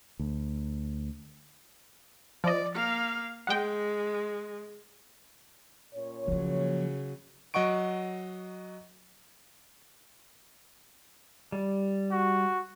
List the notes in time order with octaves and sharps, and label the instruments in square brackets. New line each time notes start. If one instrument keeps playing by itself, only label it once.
[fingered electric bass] D2
[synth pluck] F3 D#5 [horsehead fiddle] D5
[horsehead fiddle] A#3 F5
[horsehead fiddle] G#3 [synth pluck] F#5 G5
[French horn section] A#2 C#4 C#5
[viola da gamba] C#3 F#3 [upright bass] F3 A#3
[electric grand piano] F#3 D#5 F#5 C#6 D7
[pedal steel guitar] G3
[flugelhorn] F#4